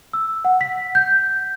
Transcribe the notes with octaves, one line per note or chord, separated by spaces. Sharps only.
E6
F#5
B6
G6